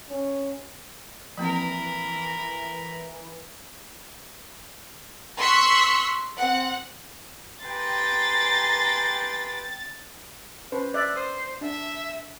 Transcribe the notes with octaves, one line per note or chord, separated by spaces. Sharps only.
C#4
E3 F3 A#3 C4 A#4 B5
C6 C#6 E6 F#6 B6
C4 F#5
G4 B4 G5 G#5 A#5 C6 A6
C#4 B4 C5
D5 E5 F#6
C5 D#6
D4 E5